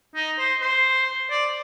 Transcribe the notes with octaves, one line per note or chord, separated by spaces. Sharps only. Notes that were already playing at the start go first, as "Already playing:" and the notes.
D#4
C5
C5
D5